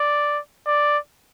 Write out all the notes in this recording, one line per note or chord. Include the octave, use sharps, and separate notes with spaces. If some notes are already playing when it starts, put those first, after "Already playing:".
Already playing: D5
D5